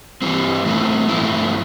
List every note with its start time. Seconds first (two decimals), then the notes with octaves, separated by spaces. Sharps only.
0.22 G2 E3 G3 C4
0.65 A2 E3 A3 C4
1.09 G2 F3 A3 C4 E4